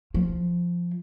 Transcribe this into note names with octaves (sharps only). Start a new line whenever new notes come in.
F3